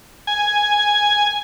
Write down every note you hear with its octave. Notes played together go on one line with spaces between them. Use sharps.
G#5